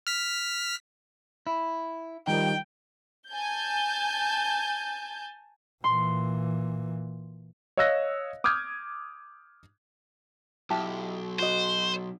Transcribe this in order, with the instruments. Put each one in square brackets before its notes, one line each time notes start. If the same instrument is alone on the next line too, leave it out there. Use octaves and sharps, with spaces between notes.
[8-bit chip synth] F6 B6
[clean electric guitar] E4
[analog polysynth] D#3 F3 G3 [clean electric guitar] D#4 [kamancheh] G5
[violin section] G#5 A5 G6
[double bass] A#2 E3 [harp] C6
[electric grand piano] C#5 D#5 F5 E6 F#6 A#6
D6 D#6 F6 G6 G#6
[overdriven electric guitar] B1 [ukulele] E4 G4 A5
[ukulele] F#4 D#5 [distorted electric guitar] C5